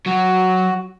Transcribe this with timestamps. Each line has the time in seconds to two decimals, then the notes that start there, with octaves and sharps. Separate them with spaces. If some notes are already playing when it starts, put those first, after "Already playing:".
0.06 F#3 F#4